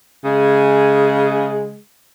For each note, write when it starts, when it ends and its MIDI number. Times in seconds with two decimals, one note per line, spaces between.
0.25 1.77 49
0.25 1.77 56
0.25 1.77 68